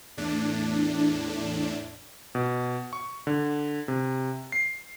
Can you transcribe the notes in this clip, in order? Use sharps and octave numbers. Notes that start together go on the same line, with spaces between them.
E2 A2 D4
B2
C#6
D3
C3
C7